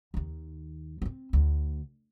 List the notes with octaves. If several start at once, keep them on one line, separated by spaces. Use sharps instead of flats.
D#2 D#3
B3 C4
D2